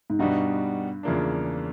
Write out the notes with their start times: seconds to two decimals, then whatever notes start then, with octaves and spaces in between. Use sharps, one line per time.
0.10 G#2
0.19 G2 B2 G3 B3 D#4 F#4
1.03 E2 C#3 F3 A#3 D4